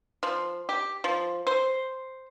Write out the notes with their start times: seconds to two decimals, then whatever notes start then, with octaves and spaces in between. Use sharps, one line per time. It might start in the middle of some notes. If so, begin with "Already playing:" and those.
0.23 F3
0.69 G4
1.04 F3
1.47 C5